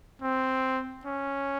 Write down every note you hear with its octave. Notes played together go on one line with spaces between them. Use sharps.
C4
C#4